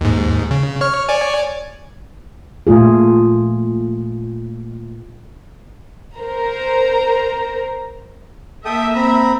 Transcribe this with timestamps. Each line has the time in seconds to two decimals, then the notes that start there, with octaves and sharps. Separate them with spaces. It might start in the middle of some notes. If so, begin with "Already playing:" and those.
0.01 D#2 G#2
0.51 C#3
0.81 C#5 C#6 F6
1.09 C#5 D5 G#5
2.67 A#2 A3 F4 G#4
6.19 A#4 C5 A#5
8.65 A#3 A4 E5 G5 D#6
8.95 C4 A#5 B5